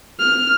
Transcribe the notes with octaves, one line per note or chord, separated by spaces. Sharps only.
F6